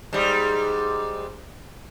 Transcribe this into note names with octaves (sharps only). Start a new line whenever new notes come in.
G#2 G3